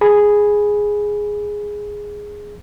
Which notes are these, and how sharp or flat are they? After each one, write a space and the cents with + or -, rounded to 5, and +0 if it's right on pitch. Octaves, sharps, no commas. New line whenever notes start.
G#4 +0 B5 +0